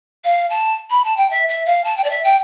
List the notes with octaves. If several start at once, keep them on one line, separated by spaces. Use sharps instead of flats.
F5
A5
B5
A5
G5
E5
E5
F5
A5
G5
D5
E5
G5